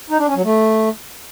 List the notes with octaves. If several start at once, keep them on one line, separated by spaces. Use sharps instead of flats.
D#4
D4
C#4
F#3
A3